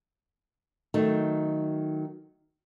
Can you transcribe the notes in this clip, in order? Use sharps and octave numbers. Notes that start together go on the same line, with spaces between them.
D#3 F#3 A3 D#4